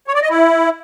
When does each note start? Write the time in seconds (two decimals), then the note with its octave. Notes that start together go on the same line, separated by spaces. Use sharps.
0.07 C#5
0.15 D5
0.22 D#5
0.29 E4